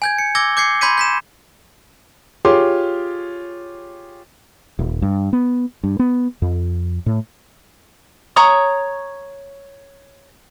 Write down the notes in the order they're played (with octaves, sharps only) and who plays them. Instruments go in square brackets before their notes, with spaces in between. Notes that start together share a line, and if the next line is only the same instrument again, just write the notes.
[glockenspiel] G#5 G6 G#6
C#7
D6 E6 G#6 A#6 G7
D6 G6 G#6 C7 C#7
B5 C6 G6 G#6 B6 D#7
G6 B6 E7
[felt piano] F4 G4 G#4 C#5 C6 D6
[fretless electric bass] D#1
G2
B3
G2
B3
F2
A2
[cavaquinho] C#5 A#5 C#6 D#6